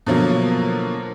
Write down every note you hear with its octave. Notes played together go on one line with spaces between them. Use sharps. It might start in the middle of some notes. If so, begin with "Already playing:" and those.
B2 D3 F3 F#3 A#3